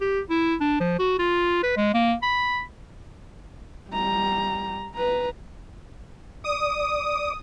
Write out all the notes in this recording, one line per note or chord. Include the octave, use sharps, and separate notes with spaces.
G4
E4
D4
F3
F#4
F4
B4
G#3
A#3
B5
G3 A#5
B4 A#5
D5 D#6